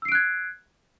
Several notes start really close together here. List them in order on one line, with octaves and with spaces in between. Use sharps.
E6 C7 D7 F#6 G#6